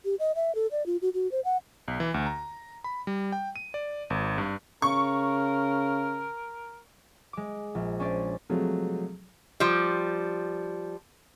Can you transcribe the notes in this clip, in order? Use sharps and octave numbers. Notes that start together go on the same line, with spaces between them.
G4
D#5
E5
A4
D5
F4
F#4
F#4
C5
F#5
B1
E3
D2
A#5
B5
G3
G5
D#7
D5
G#1
G2
C#3 A#4 C#6
G#3 D6
A#1
C#4 D4 C5 D5
C3 F3 F#3 G#3 A3
F3 G3